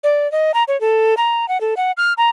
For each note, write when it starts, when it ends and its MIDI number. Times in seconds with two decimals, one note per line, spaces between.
0.04 0.30 74
0.32 0.52 75
0.54 0.63 82
0.68 0.79 73
0.81 1.15 69
1.17 1.48 82
1.48 1.60 78
1.61 1.74 69
1.77 1.92 78
1.97 2.13 89
2.18 2.30 82